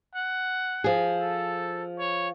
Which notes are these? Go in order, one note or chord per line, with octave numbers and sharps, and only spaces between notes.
F#5
F3 G#4
A4
C#5